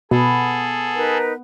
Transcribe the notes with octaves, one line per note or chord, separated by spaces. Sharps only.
B2 B3 G#4 A4
D#4 A#4 B4